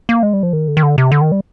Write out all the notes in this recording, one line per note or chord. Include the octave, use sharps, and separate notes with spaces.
A#3
G#3
G3
F3
D#3
D3
D#3
D3
C3
D3
D#3
G3